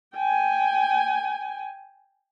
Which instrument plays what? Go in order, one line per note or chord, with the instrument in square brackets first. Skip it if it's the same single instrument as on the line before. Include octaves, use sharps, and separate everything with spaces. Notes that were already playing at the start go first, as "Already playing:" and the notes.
[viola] G5 G#5